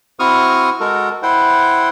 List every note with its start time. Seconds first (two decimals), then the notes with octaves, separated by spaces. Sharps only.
0.20 C4 E4 F#4 C#6 D#6 F6
0.80 G#3 F#4 A4 A#4
1.23 E4 C5 F#5 G5